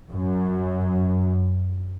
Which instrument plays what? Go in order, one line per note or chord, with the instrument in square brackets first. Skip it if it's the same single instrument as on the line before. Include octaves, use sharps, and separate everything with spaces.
[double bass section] F#2